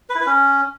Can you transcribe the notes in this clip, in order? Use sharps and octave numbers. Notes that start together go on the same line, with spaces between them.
B4
E4
B4
C#4